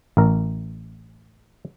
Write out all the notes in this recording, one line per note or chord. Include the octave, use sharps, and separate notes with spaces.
A1 A#4